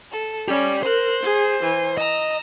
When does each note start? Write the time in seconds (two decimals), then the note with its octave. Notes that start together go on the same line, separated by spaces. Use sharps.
0.12 A4
0.48 C#4 G4 D5
0.83 A#4 C5 F#6
1.23 G#4
1.62 E3 G#5
1.97 D#5 A#5 E6